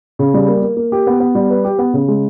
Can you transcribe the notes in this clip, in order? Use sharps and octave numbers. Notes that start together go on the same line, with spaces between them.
C#3
G3
A#3
A#3
A#3
G4
B3
B3
G3
B4
G4
B3
C#3
G#3